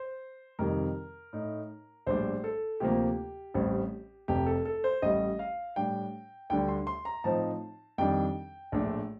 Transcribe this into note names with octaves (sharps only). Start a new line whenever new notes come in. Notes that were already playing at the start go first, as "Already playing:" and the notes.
Already playing: C5
F2 C3 D#3 G3 A#4
A2 A3 D#4
A#1 A2 G3 D4 C5
A4
D2 C3 F3 A#3 G4
A1 A2 G3 C4
F1 F2 C3 G4
A4
A4
C5
A1 A2 G3 D#5
F5
A2 G3 D4 G5
D2 D3 G3 D4 G5
C6
C6
A#5
A2 F3 C4 D#4 A5
F2 D#3 G3 D4 G5
A#1 A2 A3 D4